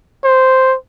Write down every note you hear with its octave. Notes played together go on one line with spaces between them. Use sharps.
C5